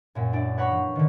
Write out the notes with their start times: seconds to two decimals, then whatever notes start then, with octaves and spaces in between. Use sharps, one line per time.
0.15 F#2 A#2
0.33 D4 E4 D5
0.57 B4 C#5 F#5 A#5 B5 C#6
0.71 F3
0.95 D3 D#3